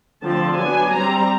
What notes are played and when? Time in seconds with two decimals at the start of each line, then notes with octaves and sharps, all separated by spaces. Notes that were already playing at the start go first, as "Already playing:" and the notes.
0.23 D3 F3 A3 C4 A5
0.58 F#3 B3 D4 G#5
0.93 G3 C4 A#5